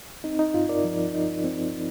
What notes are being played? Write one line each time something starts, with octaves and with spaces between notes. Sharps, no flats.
C4 D#4
D#4
G2 F4
A#4 D5
F3
D#4
C4